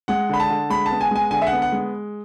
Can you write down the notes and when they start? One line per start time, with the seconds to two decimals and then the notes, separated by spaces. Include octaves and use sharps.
0.08 G#3 F#5
0.29 D3 B5
0.40 A5
0.50 D3
0.70 G#3 B5
0.86 A5
0.91 B3
1.01 G#5
1.11 G#3 G#5
1.31 D3 G#5
1.42 E5
1.47 F#5
1.52 B3
1.62 F#5
1.72 G#3